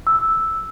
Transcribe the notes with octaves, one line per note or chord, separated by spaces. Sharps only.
E6